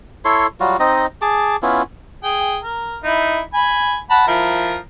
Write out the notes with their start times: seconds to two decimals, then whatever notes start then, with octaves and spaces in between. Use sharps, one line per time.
0.25 E4 A4 C#5 C6
0.60 F#3 G3 F4 F#4
0.79 C4 D#4 D#5
1.22 G#4 A5 D6
1.63 B3 C#4 E4 F4
2.24 G#4 G5
2.63 A#4
3.04 D#4 E4
3.54 G#5 B5
4.10 F#5 A5 B5
4.27 F3 E4 A#4